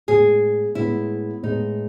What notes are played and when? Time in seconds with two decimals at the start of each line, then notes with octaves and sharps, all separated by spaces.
0.08 A2 G#3 B3 G#4
0.75 A2 G#3 B3 E4
1.43 A2 G#3 B3 D#4